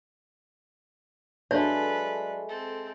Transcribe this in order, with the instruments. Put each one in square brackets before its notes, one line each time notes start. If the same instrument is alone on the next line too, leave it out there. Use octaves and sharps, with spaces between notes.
[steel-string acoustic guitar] F#3 D4 [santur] G#3 A3 [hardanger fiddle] A4 B4 [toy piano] C#5
[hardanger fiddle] C4 A4